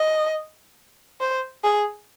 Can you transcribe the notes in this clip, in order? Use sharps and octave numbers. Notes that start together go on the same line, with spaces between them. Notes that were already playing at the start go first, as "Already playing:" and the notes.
Already playing: D#5
C5
G#4